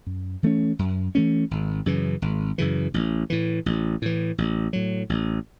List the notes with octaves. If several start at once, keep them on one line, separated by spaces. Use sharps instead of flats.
F#2
E3 A3 C#4
F#2
E3 A3 C#4
G#1
F#2 C#3 E3
G#1
F#2 C#3 E3
A1
A2 E3
A1
A2 E3
A1
A2 F#3
A1